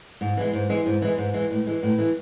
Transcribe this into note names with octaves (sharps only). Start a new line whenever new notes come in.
G#2
E3 G#3
G#2
E3 G#3
G#2
E3 G#3
G#2
E3 G#3
A2
E3 G#3
A2
E3 G#3